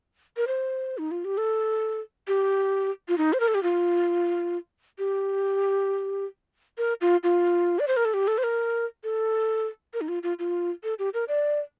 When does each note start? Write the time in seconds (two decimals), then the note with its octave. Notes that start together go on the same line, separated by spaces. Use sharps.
0.37 A#4
0.47 C5
0.98 D#4
1.11 F4
1.25 G4
1.38 A4
2.28 G4
3.08 F4
3.18 D#4
3.33 C5
3.40 A#4
3.48 A4
3.55 G4
3.63 F4
4.98 G4
6.78 A#4
7.01 F4
7.23 F4
7.79 D5
7.88 C5
7.97 A#4
8.05 A4
8.14 G4
8.28 A4
8.38 C5
8.44 A#4
9.04 A4
9.94 A#4
10.01 D#4
10.08 F4
10.23 F4
10.39 F4
10.84 A4
10.99 G4
11.14 A#4
11.28 D5